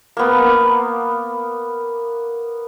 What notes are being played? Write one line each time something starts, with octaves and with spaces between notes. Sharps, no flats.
A#3 B3